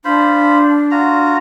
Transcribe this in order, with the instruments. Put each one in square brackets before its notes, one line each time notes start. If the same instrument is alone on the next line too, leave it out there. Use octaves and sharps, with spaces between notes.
[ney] D4 [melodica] F4 C5 B5
[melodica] F4 F#4 A#5